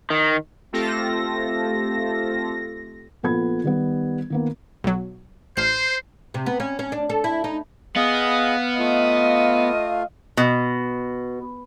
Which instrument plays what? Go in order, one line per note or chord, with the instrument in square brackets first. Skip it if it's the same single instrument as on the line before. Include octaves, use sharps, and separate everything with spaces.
[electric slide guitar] D#3
[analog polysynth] A3 C4 F4 G4 A4 A#6
[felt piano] A#1 A#2 B3 A4 B5 G#6
D#3 G3 B3
D#3 A#3 B3
[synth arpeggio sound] B1 F#3
[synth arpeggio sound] A1 F6 C7 [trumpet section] C5
[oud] C3
B3
C#4
C#4
D4
A4
E4
D#4
[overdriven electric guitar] B3 [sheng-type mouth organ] G#4 D#5 [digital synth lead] F5
[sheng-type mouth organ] A3 F4 [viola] D#5
[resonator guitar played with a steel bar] B2